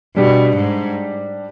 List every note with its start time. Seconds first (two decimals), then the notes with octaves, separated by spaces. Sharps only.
0.16 B2 G3 D4 G4
0.56 G#2